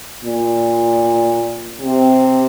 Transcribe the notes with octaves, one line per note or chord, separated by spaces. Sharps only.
A#2
C3